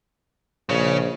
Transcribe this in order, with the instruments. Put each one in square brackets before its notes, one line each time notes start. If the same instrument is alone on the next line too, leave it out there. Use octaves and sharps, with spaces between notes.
[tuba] A#1 [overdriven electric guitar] C#3 C#4